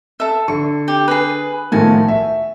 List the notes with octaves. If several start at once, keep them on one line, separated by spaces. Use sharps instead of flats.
A4 E5
D3 C#6
G4
G#4 B4
A2 D#3 F3 F#4 G#5 A5
E5